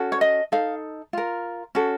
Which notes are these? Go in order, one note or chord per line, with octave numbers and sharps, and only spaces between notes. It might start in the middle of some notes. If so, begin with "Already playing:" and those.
Already playing: C#4 F#4 A4
C#5
D#5
D#4 A4 F5
F4 A#4
C#4 F#4 A4